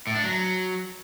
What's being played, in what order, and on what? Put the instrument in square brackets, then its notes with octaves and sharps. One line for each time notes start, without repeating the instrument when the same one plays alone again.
[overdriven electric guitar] A2
D4
F#3